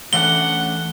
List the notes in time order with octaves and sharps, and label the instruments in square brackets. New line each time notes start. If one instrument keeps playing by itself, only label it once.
[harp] E3 [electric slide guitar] A3 C#4 D4 [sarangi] F#5 [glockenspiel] G7